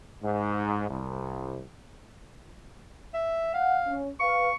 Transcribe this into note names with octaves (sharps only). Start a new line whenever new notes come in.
G#2
C2
E5
F5 F#5
C#4
B4 F5 C#6